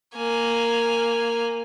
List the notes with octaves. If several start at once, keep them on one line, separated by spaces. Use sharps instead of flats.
A#3 G#5